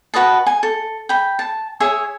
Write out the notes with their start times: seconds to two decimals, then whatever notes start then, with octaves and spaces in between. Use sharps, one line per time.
0.14 F#4 B4 D#5 A5
0.46 G#5
0.63 A4
1.09 G5 B5
1.39 A5
1.80 G#4 C#5 E5 G#5